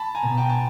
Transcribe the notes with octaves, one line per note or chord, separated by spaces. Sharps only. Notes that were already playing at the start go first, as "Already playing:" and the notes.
Already playing: A5 B5
G#5 A#5
B2
G5 A5
A5